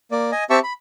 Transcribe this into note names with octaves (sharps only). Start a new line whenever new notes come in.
A#3 D5
D#5 G#5
C4 G4 E5 A5 C#6
B5